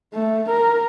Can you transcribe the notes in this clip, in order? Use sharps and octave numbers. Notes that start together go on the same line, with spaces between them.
A3
A#4